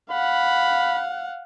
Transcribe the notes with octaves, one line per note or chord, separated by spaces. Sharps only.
F5 F#5 B5